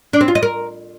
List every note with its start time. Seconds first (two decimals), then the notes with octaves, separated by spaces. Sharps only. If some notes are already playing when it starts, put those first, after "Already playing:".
0.13 D4
0.21 C4
0.28 F4
0.35 D#5
0.43 A#4